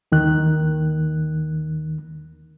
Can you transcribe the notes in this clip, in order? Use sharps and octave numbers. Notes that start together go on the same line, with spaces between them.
D#2 D#3 F#6